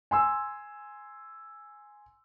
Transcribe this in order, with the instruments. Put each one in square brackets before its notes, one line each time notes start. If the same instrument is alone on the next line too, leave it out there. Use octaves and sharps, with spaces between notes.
[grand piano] G#5 C6 E6